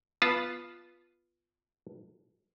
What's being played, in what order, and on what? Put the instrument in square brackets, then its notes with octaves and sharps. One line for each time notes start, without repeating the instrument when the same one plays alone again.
[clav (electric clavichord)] B3 F4 B4 A5